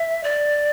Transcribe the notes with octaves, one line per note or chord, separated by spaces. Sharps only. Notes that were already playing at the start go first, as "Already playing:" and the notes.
Already playing: E5
D5